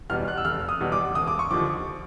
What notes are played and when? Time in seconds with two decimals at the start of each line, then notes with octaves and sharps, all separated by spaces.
0.10 E2 B2 G3 F6
0.28 F#6
0.38 E6
0.45 F1 F6
0.69 D#6
0.80 E2 B2 G3
0.92 D6
1.15 E1 D#6
1.27 D6
1.39 C#6
1.51 D#2 D3 F3 D6